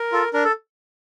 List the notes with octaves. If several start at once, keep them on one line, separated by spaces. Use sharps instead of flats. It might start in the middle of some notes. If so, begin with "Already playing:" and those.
Already playing: A#4
F4 A4
D4 A#4
A4